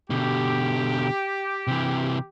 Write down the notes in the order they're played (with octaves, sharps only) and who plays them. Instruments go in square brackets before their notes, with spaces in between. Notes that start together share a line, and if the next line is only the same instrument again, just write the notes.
[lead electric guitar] B2 D3 [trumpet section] G4
[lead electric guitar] C3 E3